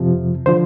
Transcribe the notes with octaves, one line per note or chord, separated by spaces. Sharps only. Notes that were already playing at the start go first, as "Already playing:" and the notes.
Already playing: F2 C3 F3
D3 F3 C5